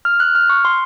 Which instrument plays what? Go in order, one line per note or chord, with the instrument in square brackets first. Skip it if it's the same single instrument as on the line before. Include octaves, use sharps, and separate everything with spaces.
[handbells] F6
F#6
F6
C#6
C6